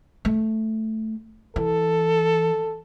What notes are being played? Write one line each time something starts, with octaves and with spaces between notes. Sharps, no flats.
A3
E3 A4